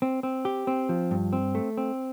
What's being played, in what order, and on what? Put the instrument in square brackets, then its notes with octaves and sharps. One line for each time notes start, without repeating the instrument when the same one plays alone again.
[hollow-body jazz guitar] C4
C4
G4
C4
F3
G2
C4
A3
C4